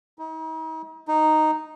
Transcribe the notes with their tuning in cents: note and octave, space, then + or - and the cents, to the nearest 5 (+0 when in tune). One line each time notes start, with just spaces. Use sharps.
D#4 +40
D#4 -5